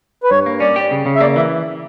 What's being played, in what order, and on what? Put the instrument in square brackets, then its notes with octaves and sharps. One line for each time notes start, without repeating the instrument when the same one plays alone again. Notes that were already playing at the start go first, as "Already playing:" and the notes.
[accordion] B4
[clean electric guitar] G2 [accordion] C#5
[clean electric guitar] A#3
[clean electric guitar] C#4 [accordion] D5
[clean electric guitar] G4
C#3
C#3
[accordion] E5
[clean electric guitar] A#3 [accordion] D5
[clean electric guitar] E3 [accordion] E5